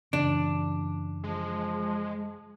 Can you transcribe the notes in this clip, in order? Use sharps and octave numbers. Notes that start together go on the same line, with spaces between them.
F#2 C#3 E3 D4
F3 G#3